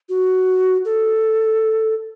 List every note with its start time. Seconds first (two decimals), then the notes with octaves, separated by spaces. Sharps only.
0.09 F#4
0.85 A4